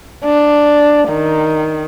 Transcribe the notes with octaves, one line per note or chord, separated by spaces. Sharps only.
D4
D#3